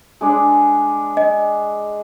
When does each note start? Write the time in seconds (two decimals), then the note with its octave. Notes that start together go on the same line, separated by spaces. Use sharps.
0.21 G#3 D4
1.17 D#5